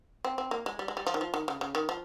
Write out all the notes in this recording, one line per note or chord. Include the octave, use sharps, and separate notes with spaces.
C4
C4
A#3
G#3
G3
G#3
G3
F3
D#3
F3
D#3
C#3
C#3
D#3
F3